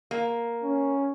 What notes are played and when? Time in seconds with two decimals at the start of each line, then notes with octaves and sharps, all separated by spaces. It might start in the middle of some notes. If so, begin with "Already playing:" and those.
0.11 A#3
0.63 C#4